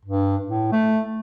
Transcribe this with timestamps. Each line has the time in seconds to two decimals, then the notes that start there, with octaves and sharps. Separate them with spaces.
0.05 G2
0.48 A2
0.72 A3